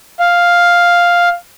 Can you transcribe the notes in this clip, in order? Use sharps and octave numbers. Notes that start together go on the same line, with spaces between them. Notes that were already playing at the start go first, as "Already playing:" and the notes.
F5